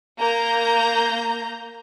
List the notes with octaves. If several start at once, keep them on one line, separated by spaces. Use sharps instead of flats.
A#3 A#5 G6